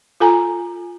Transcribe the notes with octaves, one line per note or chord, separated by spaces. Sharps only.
F4 A4 G#5 A#5